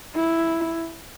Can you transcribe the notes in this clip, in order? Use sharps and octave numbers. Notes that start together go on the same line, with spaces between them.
E4